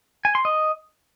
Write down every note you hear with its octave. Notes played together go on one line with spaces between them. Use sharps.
G#5
C6
D#5